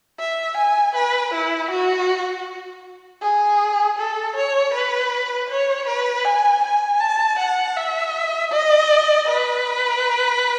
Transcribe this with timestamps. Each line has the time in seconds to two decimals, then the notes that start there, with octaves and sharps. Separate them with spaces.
0.19 E5
0.57 G#5
0.95 B4
1.33 E4
1.71 F#4
3.22 G#4
3.98 A4
4.36 C#5
4.74 B4
5.49 C#5
5.88 B4
6.25 G#5
6.63 G#5
7.00 A5
7.39 F#5
7.76 E5
8.52 D#5
9.27 B4